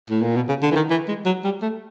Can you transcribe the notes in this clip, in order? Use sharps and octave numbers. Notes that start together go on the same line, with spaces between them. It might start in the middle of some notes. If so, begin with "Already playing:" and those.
A2
A#2
B2
C#3
D3
E3
D#3
E3
G#3
F#3
G3
A3